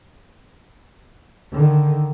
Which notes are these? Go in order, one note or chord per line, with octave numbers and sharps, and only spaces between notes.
D3 D#3